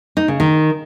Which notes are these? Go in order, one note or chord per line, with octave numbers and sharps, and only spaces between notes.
D#4
C#3
D#3